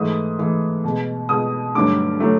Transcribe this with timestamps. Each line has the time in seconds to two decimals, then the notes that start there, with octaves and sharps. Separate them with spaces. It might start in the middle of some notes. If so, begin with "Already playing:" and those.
Already playing: G#2 E3 A3 D#6
0.39 G#2 E3 A3
0.84 B2 G#3
1.29 B2 G#3 D#6
1.75 G2 D3 F#3 A3 D6
2.20 D3 F#3 A3